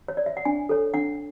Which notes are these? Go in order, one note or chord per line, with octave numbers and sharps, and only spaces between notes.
C#5
D5
E5
F#5
D4 G#5
A4 C#5
D4 F#5